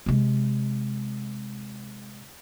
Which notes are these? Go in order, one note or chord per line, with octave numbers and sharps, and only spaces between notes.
C3 G#3